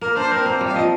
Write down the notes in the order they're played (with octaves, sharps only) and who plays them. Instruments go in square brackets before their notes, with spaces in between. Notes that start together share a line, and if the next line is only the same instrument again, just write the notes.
[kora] A#3 [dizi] A#4
[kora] D4 [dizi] C5
[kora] C4 [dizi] A#4
[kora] A#3 [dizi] C5
[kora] G3
[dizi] F5
[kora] F3 [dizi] D#5